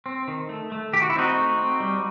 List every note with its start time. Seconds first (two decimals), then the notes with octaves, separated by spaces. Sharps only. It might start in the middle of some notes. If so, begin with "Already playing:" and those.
0.06 C4
0.28 D#3
0.49 A3
0.72 A3
0.93 D#3 G4
1.02 F#4
1.10 E4
1.15 C4 D#4 F#4
1.37 A3
1.59 C4
1.80 G3